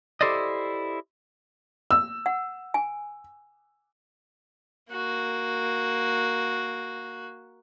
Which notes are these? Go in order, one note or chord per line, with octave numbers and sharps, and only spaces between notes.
E4 G4 A4 C5 D5 D#5
E6
F#5
G#5
A#3 F#4